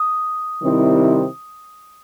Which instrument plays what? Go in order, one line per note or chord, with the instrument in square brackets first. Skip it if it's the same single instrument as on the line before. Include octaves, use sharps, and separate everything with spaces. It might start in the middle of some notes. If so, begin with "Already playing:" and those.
Already playing: [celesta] D#6
[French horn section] C3 D#3 G3 C4 E4